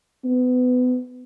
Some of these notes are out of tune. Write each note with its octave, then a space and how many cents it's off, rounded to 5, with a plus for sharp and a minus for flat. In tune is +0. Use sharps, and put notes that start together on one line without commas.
B3 +25